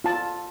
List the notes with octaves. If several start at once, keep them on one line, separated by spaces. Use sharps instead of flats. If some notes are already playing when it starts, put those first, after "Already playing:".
F4 A5